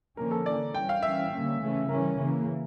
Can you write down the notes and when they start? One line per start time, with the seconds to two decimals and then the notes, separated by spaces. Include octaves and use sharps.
0.17 D3 F3 A#3 C#4 A#4
0.31 A4
0.46 E3 A#3 C#4 D5
0.74 E3 G3 C#4 G5
0.89 F5
1.03 E3 G3 C#4 E5
1.31 D3 G3 A#3 C#4
1.61 C#3 E3 A3 C#4
1.89 E3 G3 C#4 A#4
2.18 C#3 E3 A#3